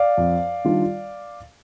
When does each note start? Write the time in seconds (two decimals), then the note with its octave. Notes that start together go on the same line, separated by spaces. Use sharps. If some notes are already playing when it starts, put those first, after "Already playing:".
Already playing: D5 F5
0.18 F2
0.65 D#3 G3 D4 F4